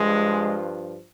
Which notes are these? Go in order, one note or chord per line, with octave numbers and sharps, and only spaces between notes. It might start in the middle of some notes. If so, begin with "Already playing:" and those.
Already playing: G2 F3 G#3